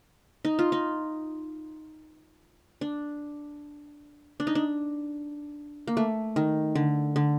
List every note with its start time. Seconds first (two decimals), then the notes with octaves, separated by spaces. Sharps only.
0.45 D#4
0.59 F4
0.72 D#4
2.81 D4
4.40 D4
4.47 D#4
4.55 D4
5.87 A#3
5.97 A3
6.36 D#3
6.75 D3
7.16 D3